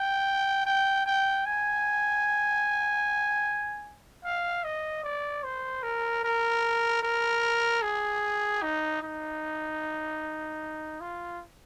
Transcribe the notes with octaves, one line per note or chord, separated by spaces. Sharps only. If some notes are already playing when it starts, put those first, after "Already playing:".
Already playing: G5
G5
G5
G#5
F5
D#5
D5
C5
A#4
A#4
A#4
G#4
D#4
D#4
F4